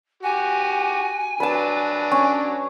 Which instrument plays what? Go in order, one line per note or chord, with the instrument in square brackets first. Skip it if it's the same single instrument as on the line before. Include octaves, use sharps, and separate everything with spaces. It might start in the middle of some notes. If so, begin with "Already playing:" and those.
[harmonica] F#4 G4 [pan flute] G#5
[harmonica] F#3 D4 [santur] B4 A5
[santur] C#4